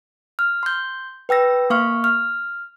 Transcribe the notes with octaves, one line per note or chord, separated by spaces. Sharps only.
F6
C6 G6
B4 G5 E6 A#6
A#3 F5 C#6 F6
F6